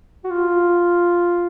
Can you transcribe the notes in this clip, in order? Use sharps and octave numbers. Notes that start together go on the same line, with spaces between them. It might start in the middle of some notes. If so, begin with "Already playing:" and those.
F#4
F4